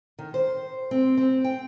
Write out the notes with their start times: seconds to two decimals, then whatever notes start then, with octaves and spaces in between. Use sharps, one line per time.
0.19 D#3
0.34 C5
0.91 C4
1.17 C4
1.44 G5